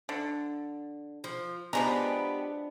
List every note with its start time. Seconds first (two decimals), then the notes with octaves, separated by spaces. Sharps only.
0.09 D3
1.24 F3
1.73 F3 G#3 B3 D4 G4 A#5